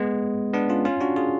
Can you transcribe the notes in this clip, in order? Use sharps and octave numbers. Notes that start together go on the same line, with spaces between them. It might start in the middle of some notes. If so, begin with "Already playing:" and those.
Already playing: G#3 B3
B3 D4
C#4 F4
C#4 F4
D4 F#4
F4 G#4